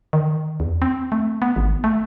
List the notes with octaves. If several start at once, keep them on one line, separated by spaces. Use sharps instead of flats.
D#3
E2
C4
A3
B3
G#1
A3